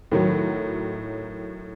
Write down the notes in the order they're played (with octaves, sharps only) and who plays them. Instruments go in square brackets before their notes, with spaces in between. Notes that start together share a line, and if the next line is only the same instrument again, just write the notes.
[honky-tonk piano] A2 D#3 F#3